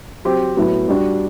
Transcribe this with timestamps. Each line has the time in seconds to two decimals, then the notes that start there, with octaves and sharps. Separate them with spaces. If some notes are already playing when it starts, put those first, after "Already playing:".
0.25 F#3 C4 G4
0.57 A2 F#3 B3
0.88 G3 D4 F#4